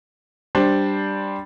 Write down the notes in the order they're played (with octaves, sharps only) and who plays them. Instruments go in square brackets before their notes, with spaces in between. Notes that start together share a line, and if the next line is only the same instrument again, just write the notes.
[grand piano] G3 D4 C5